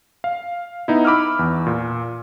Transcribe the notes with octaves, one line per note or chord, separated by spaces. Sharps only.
F5
B3 D#4 E4
B5 D6 E6 F6
E2
A#2